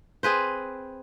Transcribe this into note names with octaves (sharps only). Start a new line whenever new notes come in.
C4 G#4 B4 C5